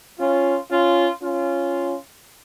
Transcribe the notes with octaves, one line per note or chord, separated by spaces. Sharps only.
C#4 F4
C#4 F4
C#4 F4